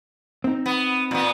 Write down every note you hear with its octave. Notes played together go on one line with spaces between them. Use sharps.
C4 D#4
B3
A#2 B3